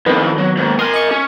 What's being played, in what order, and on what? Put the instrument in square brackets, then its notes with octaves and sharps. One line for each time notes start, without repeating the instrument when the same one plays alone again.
[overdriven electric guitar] F2 A2 [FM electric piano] D#3 B3
[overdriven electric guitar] F#3
D#2 G#2
[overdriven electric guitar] A#4 G#5 [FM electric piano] C6 D#6
[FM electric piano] D#5 C#6
[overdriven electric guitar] C#4